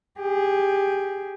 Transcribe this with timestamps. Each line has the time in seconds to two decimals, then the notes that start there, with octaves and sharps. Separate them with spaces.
0.20 G4 G#4